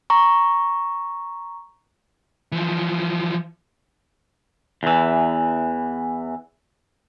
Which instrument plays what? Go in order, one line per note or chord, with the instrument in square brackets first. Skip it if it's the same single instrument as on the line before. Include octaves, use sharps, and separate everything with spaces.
[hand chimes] A#5 C#6
[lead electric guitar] E3 F3
[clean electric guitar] E2 E3